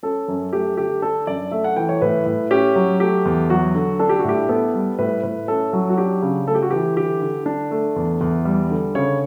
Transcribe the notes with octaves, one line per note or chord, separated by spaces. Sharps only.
C#4 A4
F#2
A3 G4
D3 G4
D4 A4
F#2 D5
A3 E5
F#5
E3 G5
C#5
A2 B4
A2
C#4 G4
F#3
A3 G4
E2
F#3 F#4
D3
D4 A4
G4
F#4
A2 G4
B3 A4
G3
A2 B4
A2 B4
C#4 A4
F#3
F#4
D4 G4
C#3
A3 A4
G4
F#4
E3 G4
D3 G4
D3
D4
A3
E2
E2
G3
D3
C#3 C#5